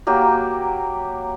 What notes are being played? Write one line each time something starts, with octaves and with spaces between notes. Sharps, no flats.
F#3 A#3 G4